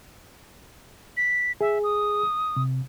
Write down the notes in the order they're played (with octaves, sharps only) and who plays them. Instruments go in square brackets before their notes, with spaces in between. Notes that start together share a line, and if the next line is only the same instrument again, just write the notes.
[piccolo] B6
[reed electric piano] G#4 [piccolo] E5
[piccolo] D#6
[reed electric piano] C3